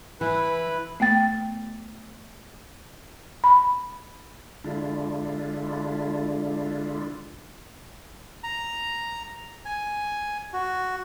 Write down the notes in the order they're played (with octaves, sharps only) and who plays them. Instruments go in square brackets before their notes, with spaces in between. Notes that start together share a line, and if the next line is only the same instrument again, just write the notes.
[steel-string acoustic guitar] E3 [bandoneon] E4 [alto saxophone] B4
[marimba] A3 B3 G5 A6
B5
[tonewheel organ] D3 G#3 D4 E4 F4
[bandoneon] A#5
G#5
F#4